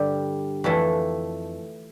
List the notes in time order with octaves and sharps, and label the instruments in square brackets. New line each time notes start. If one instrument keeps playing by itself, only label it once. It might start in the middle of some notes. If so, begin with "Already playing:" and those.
Already playing: [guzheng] G2 D3 G3 G4
F2 E3 A3